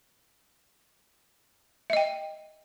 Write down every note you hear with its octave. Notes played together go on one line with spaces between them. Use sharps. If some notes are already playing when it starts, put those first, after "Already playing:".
D#5 E5 G5